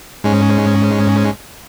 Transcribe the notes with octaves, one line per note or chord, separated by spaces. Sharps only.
G#2 G#3 C#4